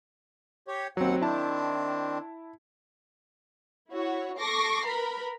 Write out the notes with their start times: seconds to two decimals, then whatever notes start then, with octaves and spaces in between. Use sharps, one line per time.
0.68 G4 C#5
0.97 D#2 B2 F#3 C4 F#5
1.22 D#3 C4 D4 E4 A5
3.90 E4 F#4 C#5
4.39 A4 C#6 D6 A#6 C7
4.86 A#4 B4 A#5 B5